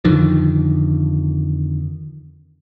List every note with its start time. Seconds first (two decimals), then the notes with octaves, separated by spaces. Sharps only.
0.04 F2 D3 D#3 F3